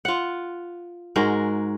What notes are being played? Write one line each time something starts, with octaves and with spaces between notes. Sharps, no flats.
F4 F#5
G#2 G#3 F#4 A#4